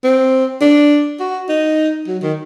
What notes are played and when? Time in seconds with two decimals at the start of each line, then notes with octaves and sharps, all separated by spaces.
0.04 C4
0.61 D4
1.20 F#4
1.49 D#4
2.07 F#3
2.22 D#3